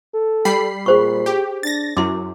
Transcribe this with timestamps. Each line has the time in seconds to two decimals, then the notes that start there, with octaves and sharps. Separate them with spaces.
0.14 A4
0.45 G3 G5 B5 C7
0.86 A#2 G#4 C5 C#6
1.26 G4
1.63 D4 A6 A#6
1.97 F#2 F#3 E4 C6 D6